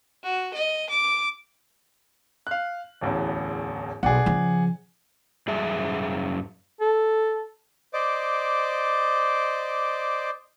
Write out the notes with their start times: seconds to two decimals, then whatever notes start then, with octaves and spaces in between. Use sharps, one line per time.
0.23 F#4
0.54 D#5
0.90 D6
2.47 F5 F#6
3.01 D1 A1 E2
4.03 B1 G#4 D5 F#5
4.26 C#3 F3
5.48 F#2 G3 G#4 E5
6.81 A4
7.94 C5 D5 D#5 D6